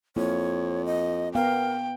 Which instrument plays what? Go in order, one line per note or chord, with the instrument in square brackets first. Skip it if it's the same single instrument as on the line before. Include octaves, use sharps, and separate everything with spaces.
[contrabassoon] F2 [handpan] A#3 E4 [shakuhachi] C#5
[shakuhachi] D#5
[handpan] B3 F5 [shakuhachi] A#4 [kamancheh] G5